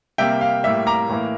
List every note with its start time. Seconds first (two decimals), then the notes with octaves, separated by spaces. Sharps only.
0.18 C3 G3 A#3 E5 G5
0.41 F5
0.64 A2 G3 A#3 E5
0.86 A#5 D6
1.09 A2 E3 A#3